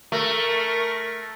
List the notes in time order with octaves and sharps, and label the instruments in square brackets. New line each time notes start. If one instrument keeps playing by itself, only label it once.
[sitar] A3 [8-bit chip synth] A#4 C#6 A#6